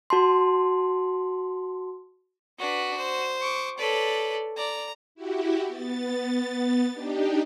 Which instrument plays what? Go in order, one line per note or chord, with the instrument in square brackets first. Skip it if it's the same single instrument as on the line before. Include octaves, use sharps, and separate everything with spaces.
[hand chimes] F#4 A5 C6
[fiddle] D4 B4 [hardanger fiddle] F#4
[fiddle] C5
[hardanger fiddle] C#6 D6
[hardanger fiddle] A4 D5 [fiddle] B4 C#5
[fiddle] D5 [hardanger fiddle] A#5
[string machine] E4 F#4 G4
B3 A6
D4 D#4 G4